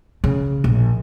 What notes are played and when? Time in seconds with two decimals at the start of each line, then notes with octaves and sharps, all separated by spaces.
0.24 C#3
0.64 A#1